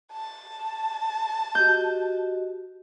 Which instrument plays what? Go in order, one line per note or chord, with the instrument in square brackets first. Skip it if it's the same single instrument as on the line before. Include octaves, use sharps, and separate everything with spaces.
[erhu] A5
[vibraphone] F#4 G4 D#5 [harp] G6